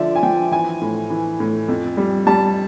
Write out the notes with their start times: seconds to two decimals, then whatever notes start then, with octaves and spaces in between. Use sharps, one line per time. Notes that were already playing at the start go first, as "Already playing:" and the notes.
Already playing: D3 F3 D5 E5
0.16 G#5
0.23 F3 G5
0.52 E3 G#5
0.81 A2
1.10 E3
1.40 A2
1.68 F2
1.97 G3
2.27 G3 A5